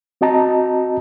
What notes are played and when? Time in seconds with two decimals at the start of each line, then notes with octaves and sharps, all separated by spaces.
0.21 C4 F#4 D#5 A5 A#5